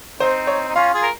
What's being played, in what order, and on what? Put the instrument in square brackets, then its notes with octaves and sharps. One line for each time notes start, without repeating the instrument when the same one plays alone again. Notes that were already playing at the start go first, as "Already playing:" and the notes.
[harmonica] C4 D#4 [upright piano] C5
[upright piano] C#5
[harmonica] D#4
[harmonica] C#4 F4 [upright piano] F5
[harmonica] F4 G#4
A#4